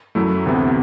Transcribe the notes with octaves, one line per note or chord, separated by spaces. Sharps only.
F#2 F#3 A3 E4
D2 C3 E3 B3 E4